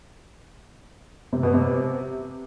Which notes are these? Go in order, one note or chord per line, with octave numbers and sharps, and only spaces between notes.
C3
B2
C3